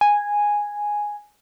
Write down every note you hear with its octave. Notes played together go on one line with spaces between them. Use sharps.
G#5